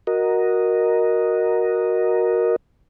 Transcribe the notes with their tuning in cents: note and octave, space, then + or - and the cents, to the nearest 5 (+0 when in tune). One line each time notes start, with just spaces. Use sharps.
F#4 -10 A#4 +0 D#5 +0